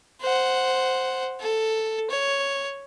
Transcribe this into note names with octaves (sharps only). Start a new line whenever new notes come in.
C5 F#5
A4
C#5